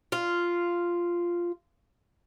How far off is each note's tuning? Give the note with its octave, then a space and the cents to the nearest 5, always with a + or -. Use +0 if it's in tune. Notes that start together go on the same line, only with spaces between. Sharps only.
F4 -5